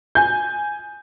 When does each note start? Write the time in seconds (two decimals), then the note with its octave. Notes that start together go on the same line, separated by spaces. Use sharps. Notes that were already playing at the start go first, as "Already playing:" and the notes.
0.15 G#5 G6